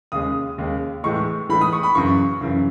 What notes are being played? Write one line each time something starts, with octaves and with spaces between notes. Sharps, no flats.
D#2 C#3 G#3 D#6
D#2 C#3 G#3
A2 E3 G#3 C#6
A2 E3 G#3 B5
D#6
C#6
B5
F#2 C#3 E3 C#6
F#2 C#3 E3